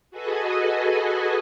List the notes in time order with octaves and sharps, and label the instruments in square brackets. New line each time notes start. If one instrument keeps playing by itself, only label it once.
[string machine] F#4 G#4 A4 B4 D#5 G#5